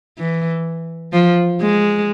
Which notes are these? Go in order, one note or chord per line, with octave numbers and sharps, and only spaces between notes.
E3
F3
G#3